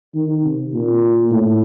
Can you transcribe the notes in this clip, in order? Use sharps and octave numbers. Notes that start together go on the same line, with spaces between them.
D#3
C3
A#2
A2